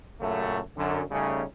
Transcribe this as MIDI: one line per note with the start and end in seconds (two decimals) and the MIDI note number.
0.21 0.60 42
0.21 0.60 46
0.21 0.60 49
0.21 0.60 57
0.77 1.02 42
0.77 1.02 50
1.11 1.44 49
1.11 1.44 55
1.11 1.44 57
1.11 1.44 61
1.11 1.44 63